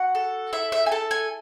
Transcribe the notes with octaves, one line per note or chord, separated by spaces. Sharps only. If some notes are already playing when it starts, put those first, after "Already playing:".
Already playing: F#4 F#5
A4
E4 E5
E5
G#5
A4 A5
G#5